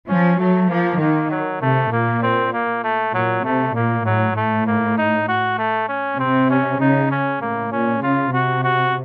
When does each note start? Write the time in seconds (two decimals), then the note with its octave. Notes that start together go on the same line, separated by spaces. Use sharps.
0.08 F3 C#4
0.39 F#3 A3
0.70 F3 A#3
1.00 D#3 A#3
1.31 F#3
1.61 C3 A3
1.92 A#2 A#3
2.23 C4
2.53 A#3
2.84 A3
3.14 A#2 F#3
3.45 C3 A3
3.75 A#2 A#3
4.06 A2 F#3
4.36 A2 A3
4.67 A#3
4.98 D#4
5.28 F#4
5.58 A3
5.89 C#4
6.20 C3 C4
6.50 C#4
6.80 C#3 D#4
7.11 C#4
7.42 A2 A#3
7.72 A#2 C#4
8.02 C#3 F4
8.33 C3 F#4
8.64 F#4